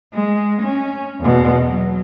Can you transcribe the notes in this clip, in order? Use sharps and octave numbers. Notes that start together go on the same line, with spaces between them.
G#3
C#4
E2 B2
F#3